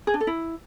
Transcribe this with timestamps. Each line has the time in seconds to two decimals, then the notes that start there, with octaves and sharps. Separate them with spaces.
0.07 G#4
0.14 D4
0.20 A4
0.27 E4